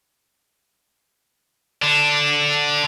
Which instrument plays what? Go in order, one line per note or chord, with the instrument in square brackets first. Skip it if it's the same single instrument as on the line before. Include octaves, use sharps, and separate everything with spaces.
[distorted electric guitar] D3 D4